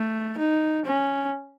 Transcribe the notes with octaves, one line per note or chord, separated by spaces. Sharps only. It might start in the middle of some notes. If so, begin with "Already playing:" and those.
Already playing: A3
D#4
C#4